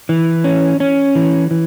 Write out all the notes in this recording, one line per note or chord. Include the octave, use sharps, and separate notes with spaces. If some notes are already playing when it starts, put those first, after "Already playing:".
E3
C#4
C#4
E3
E3